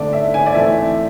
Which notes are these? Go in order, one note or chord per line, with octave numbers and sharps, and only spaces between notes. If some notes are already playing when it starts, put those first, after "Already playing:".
Already playing: D3 A3 C4 D5
E5
G#5
D5
E3 A3 C4 E5